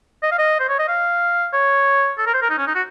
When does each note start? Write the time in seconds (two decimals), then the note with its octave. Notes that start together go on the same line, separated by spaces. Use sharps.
0.23 D#5
0.31 F5
0.38 D#5
0.60 C5
0.69 C#5
0.79 D#5
0.88 F5
1.53 C#5
2.18 A4
2.26 A#4
2.34 C5
2.42 A#4
2.50 D#4
2.58 C#4
2.67 D#4
2.75 F#4